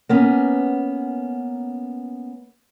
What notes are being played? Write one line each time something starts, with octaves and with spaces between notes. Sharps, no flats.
A#3 B3 C#4